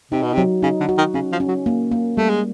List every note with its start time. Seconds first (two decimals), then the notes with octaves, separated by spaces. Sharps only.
0.11 C3 D#4
0.23 B2
0.33 C3
0.38 F#3
0.63 C#3 D#4
0.80 D3
0.89 F#4
0.98 D#3
1.14 C#3 C#4
1.32 F3
1.40 C#4
1.48 F#3
1.66 A#3
1.92 A#3
2.17 G3 A3
2.29 G#3